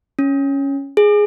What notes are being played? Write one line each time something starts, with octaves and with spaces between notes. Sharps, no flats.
C#4
G#4